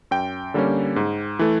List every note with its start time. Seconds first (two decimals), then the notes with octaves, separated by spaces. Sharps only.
0.11 F#2 G5
0.54 D3 G3 A#3 C#4
0.96 G#2
1.39 E3 A3